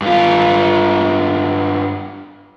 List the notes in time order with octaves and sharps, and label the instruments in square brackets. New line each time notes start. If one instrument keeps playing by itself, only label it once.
[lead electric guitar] G2 F4